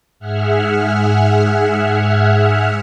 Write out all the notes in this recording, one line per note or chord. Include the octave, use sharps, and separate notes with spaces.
G#2 G#4 E5 F#5 F6